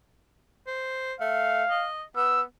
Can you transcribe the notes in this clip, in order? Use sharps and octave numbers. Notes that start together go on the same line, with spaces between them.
C5
A3 F5
D#5
B3 E6